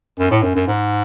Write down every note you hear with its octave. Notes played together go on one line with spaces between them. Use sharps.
F#2
A2
F#2
F#2
G#2